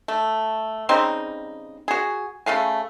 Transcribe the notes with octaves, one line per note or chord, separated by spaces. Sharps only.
A3
C#3 G3 C4 D#4
F#4 G#4
C#3 A3 F5 G#5